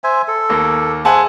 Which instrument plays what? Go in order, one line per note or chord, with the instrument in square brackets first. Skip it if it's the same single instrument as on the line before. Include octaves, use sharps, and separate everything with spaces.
[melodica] C5 E5 G#5
A4
[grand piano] D#2 A#3
[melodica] G#4 C5 E5 [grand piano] F#5 G#5 A5